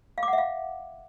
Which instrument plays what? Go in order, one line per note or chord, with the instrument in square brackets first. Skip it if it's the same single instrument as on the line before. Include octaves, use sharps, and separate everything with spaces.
[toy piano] F5
D6
F#5
E5
F5